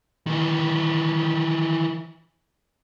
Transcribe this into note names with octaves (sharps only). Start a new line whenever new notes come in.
D#3 E3